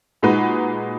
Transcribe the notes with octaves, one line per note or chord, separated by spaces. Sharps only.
A#2 G#3 D#4 F#4 B4